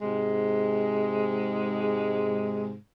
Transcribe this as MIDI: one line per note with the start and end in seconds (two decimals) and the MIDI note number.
0.01 2.76 44
0.01 2.76 48
0.01 2.76 56